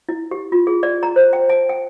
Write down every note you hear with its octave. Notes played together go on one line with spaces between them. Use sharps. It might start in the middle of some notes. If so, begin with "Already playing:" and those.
E4
G4
F4
G#4
D5
A#5
C5
G5
A5
G5